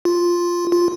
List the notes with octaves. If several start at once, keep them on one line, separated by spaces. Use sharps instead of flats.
F4
F4